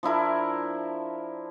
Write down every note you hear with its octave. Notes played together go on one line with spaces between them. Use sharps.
F3 D4 E4 A#4